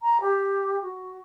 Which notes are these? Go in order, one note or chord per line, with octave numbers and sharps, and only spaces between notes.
A#5
G4
F#4